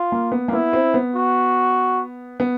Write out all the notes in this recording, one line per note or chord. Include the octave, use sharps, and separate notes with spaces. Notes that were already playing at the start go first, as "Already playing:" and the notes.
Already playing: F4
A#3
B3
A#3
B3 E4
C4
B3
F#4
B3